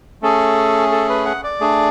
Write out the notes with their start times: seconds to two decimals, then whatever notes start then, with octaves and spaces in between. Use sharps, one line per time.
0.22 A3 C#4 G#4 A4
0.92 A4
1.09 B4
1.26 F#5
1.44 D5
1.60 A3 D4 G#4